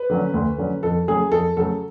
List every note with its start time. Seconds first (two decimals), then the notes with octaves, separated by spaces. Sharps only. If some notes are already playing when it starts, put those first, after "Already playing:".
Already playing: B4
0.10 D3 F#3 C#4
0.34 D2
0.58 D3 F#3 C#4
0.83 F2 A4
1.08 C#3 F#3 A3 G#4
1.32 F2 A4
1.57 C#3 F#3 A3 A4